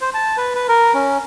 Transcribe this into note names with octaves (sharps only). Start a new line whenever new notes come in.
C5
A5
B4
B4
A#4
C#4